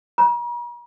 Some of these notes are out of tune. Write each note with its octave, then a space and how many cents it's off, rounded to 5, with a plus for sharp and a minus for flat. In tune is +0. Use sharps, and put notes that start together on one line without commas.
A#5 +45